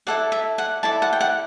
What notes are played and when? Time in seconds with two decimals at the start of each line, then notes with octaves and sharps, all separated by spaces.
0.07 E4 A4 D5 F#5
0.32 E5
0.58 F#5
0.83 E4 A4 D5 A5
1.02 F#5
1.13 G5
1.21 F#5